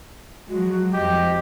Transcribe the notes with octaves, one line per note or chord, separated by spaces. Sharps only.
F3 F#3 G#3 F#4
F2 F3 G4 D#5